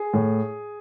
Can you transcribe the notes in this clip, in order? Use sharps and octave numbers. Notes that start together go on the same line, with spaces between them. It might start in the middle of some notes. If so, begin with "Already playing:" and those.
Already playing: G#4
A2